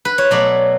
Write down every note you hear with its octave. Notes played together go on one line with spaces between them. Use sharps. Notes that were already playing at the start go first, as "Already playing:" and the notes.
B4
C#5
B2 F#3 A3 D5